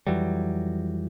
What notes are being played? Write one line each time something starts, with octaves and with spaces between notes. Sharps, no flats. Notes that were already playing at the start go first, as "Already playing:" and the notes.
F2 E3 F#3 G3